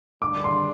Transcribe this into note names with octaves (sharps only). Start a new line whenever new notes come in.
G2 D3 G#3 D4 D6
C6